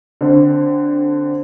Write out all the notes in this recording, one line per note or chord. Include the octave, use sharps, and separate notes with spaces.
D3 C4 D4